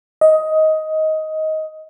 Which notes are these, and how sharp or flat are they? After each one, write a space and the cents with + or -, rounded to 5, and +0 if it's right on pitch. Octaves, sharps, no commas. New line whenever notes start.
D#5 +15